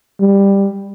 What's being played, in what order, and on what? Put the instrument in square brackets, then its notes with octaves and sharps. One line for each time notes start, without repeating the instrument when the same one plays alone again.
[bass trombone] G3